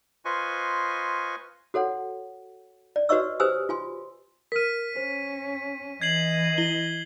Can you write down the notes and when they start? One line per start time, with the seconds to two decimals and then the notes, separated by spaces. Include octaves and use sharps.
0.25 F4 B4 C5 D#5 G#5 C#6
1.74 F#4 A4 C#5 F#5
2.96 D5
3.09 F#4 B4 C#5 D#5 C#6 E6
3.40 G4 B4 C5 G#5 D#6 E6
3.69 F4 G#5 C6
4.52 A#4 F6 B6 D#7
4.96 C#4 C5
6.02 E3 D#5 G#6 C7 F#7
6.58 E4 G7